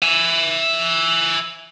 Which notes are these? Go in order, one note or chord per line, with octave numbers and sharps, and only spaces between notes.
E5 G#5